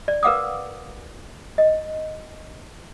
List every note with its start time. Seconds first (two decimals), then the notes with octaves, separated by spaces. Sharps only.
0.08 D5
0.23 A#4 B4 F5 F#5 D6 D#6
1.58 D#5